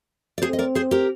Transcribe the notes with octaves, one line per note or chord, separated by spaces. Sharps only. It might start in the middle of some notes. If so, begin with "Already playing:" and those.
D5
C4 G#4 C5
D#5
A#4 D5
G#4 C5
G4 A#4